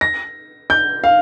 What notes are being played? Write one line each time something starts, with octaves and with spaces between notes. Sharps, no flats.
A#6
G6
F5